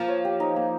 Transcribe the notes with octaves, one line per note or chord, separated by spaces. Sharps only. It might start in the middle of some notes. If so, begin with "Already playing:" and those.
Already playing: F3 A#3
C#5
G4
D#4
A#3